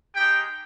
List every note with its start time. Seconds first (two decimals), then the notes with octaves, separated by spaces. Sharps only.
0.15 G#3 D#4 G4 G5